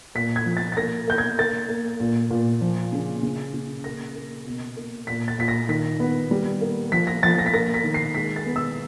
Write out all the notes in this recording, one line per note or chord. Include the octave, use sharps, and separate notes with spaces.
A#2 B6
G#6
F3
A6
A6
A#3 A#6
A#3 G6
G#6
A#3 A6
A#3
A#2
A#2
F3
C#3
C#3
C#3
A#3 A#6
A#3
B2
A#3
A#2 B6
A6
A#2 B6
A#6
D#3 B6
B3
G3
A#3
F3 B6
A#6
F3 A6
A#6
B6
A#3 A#6
B6
D#3
C7
G#3 B6
A6
B3
E6